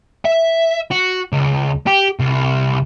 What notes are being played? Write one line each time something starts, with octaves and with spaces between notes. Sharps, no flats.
E5
F#4
C#2
G4
C2